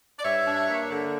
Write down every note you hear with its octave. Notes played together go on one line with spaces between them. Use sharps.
D5
G2 C#5 E5
D4
A#3
D3